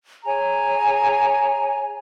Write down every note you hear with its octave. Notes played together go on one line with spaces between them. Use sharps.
G#4 C#5 G#5 A#5